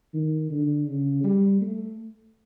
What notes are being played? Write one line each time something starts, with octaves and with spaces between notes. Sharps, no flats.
D#3
D3
C#3
G3
A3